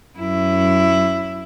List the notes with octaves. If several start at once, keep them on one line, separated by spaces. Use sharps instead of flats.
F#2 E4